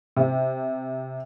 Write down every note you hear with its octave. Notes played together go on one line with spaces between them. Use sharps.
C3